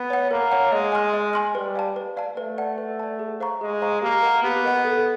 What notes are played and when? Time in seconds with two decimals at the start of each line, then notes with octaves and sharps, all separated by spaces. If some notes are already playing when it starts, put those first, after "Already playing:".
Already playing: B3
0.10 C#5 F#5
0.31 A#3 A#4
0.52 C#5 F#5
0.72 G#3 D#5
0.92 G#5 C6 F6
1.14 D#5
1.33 G#5 C6 F6
1.55 G3 B4
1.75 D5 F5 A5
1.96 B4
2.17 D5 F5 A5
2.37 A3 B4
2.58 D5 F#5 A5
2.78 B4
2.99 D5 F#5 A5
3.19 G#4
3.40 C5 F5 A#5 C#6
3.61 G#3 G#4
3.82 C5 F5 A#5 C#6
4.02 A#3 G4
4.23 A#4 D#5 F#5
4.43 B3 G4
4.64 A#4 D#5 F#5
4.85 A4